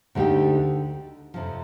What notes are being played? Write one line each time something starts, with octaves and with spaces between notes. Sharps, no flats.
D2 D3 A3 D#4 G4
F2 C3 F3